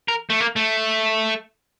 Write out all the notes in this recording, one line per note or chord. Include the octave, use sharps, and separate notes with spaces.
A#4
A3
A#3
A3